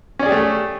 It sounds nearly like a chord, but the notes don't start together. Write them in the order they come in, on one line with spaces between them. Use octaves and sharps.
C#4 D5 G#4 G4 A3